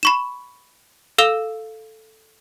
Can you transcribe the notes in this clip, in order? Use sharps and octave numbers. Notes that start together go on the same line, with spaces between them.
B5 C#6 E7
A4 F5 E6 F7 G7